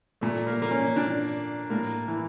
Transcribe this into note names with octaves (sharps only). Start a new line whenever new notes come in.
A#2 A3
A#3
A#3
C#4
A#2 D4
A2 A#3
E3